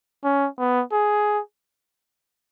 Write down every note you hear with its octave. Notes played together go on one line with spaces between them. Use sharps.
C#4
B3
G#4